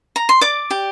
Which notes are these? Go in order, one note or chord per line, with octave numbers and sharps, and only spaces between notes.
A#5
C6
D5 D6
G4